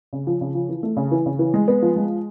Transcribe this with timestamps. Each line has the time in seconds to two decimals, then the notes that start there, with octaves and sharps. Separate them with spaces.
0.13 C#3
0.27 F3
0.41 C#3
0.55 F3
0.69 E3
0.83 A3
0.97 C#3
1.12 E3
1.26 C#3
1.39 E3
1.54 G#3
1.68 B3
1.82 F3
1.96 G#3